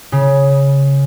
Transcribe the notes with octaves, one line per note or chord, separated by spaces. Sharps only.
C#3